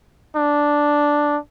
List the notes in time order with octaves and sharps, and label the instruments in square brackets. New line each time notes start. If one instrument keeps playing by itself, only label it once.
[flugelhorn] D4